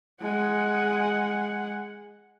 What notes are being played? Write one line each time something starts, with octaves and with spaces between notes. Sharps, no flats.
G#3 F#5